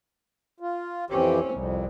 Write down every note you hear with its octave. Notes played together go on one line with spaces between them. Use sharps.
F4
F2 E3 C4 C#4 G4
C2 F2